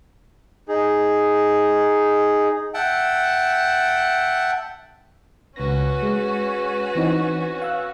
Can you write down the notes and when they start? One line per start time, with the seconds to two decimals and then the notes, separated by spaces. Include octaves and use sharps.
0.68 D#4 G#4
2.74 E5 F#5 G5 A5
5.56 C#2 C#4 F#4 B4 A#6
6.02 G#3
6.95 E3 C4 D#4
7.62 F5 E6 F#6